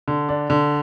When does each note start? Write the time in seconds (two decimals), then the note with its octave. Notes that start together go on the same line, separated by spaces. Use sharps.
0.08 D3
0.29 D4
0.50 D3